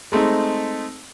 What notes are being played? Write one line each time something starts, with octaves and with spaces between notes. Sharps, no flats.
G#3 A3 C4 D#4